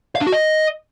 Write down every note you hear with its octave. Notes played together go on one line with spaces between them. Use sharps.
F5
D4
F#4
D#5